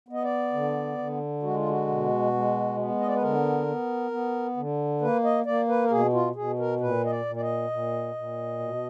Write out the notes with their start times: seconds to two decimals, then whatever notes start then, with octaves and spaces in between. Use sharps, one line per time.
0.08 B3 D#5
0.24 D5
0.53 D3
0.98 D3
1.43 G#3 F#4
1.56 F4
1.69 F#4
1.87 B2
2.33 G#3
2.77 B3
3.00 D#5
3.08 D5
3.15 B4
3.21 D3 A#4
3.67 B3
4.11 B3
4.57 D3
5.01 A#3 B4
5.24 D#5
5.46 A#3 D5
5.68 B4
5.84 A#4
5.91 B2 G#4
6.13 F4
6.35 B2 G#4
6.59 A#4
6.80 A#2 B4
7.05 D#5
7.10 D5
7.25 A#2
7.36 D5
7.41 D#5
7.70 A#2
8.15 A#2
8.60 B2